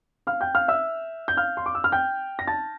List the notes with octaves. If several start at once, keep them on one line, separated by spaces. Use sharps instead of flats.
F5 F6
G5 G6
F5 F6
E5 E6
G6
F5 F6
C6
D6
E6
F6
G5 G6
A#6
A5 A6